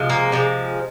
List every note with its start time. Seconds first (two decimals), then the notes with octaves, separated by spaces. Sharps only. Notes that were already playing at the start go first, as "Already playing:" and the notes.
Already playing: C3 F3 G#3
0.10 A#3
0.32 C3 F3 G#3